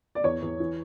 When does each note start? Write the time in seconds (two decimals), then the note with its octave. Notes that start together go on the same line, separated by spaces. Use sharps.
0.15 D5
0.24 E2 C#5
0.42 E2
0.60 E3